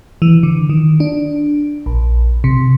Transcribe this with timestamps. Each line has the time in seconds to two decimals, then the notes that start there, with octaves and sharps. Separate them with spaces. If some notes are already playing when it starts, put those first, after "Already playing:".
0.22 E3
0.43 D3
0.70 D#3
1.00 D4
1.86 A#1
2.44 C3